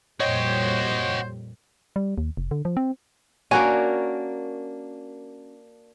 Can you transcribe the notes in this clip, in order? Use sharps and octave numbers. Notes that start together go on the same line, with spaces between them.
F2 A#2 G3 F#4 C5 C#5 D#5 G5
G3
D#2
F1
D3
F3
C4
A#3 C#4 D4 F#4 A#4 G#5